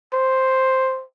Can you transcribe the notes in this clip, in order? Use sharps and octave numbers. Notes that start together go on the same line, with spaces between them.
C5